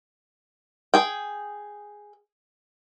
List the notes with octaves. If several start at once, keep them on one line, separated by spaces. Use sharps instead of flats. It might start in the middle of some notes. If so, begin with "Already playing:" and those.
G#4 G5